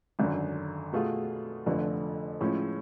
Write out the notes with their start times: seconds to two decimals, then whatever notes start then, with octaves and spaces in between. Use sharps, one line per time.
0.19 G#1 F#2 D3
0.93 B2 A3 F4 G#4
1.66 F1 F2 D3 F3 A3
2.40 A2 F3 G#3 C#4